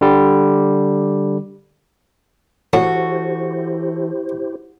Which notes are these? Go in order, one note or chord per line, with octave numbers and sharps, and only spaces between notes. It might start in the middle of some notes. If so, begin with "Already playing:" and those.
D3 G3
A2 E3 E4 F#4 G4 A4 C5 C#5